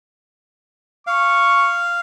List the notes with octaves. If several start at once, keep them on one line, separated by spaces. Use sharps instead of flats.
F5 C#6